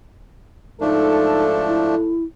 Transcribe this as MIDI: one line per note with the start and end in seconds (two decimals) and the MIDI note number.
0.81 2.14 44
0.81 1.95 53
0.81 1.95 57
0.81 1.95 62
0.81 1.44 63
0.81 2.14 69
1.67 2.24 64